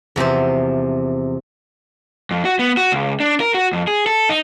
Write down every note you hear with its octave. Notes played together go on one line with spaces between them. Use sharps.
E2 C3 F3 C5
F2
F#4
B3
F#4
C#2
D4
A#4
F#4
F2
G#4
A4
D#4